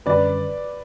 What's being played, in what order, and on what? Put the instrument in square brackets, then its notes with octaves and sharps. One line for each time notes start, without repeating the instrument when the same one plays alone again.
[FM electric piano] F#2 D3 G3 C#4 [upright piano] B4 D5